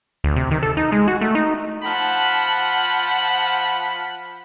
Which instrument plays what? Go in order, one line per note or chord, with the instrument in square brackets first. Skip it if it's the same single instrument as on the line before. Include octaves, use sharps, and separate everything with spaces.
[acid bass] D2
C3
D#3
A4
D#4
G#3
F#4
A3
D#4
[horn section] F3 F#5 A5 B5